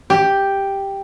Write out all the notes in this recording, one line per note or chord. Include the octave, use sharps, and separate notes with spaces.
G4